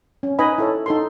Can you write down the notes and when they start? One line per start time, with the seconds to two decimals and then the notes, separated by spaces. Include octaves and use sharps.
0.23 C#4
0.39 D#4 B4 D#5 G#5 B5
0.58 E4 A4 C#5
0.86 D#4 A4 C6